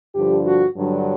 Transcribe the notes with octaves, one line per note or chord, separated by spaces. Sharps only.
G2 D3 F3 G4
F#4
G2 D3 F#3